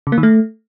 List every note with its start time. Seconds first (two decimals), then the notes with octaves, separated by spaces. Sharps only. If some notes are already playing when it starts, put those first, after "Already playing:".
0.07 C#3
0.12 A#3
0.18 D#3
0.23 A3